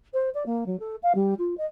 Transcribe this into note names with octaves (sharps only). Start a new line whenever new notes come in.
C5
D5
A#3
F#3
A4
F5
G3
F4
D#5